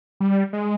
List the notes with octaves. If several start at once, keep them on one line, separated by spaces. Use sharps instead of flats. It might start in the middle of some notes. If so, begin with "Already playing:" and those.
G3
G#3